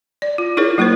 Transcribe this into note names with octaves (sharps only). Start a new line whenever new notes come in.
D5
F4
D#4 E4 G#4 A#4 C#5
F#3 A#3 E4 A#4 C5